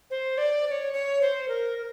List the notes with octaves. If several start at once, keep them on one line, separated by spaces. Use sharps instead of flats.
C5
D5
D5
C#5
C#5
C5
A#4
A#4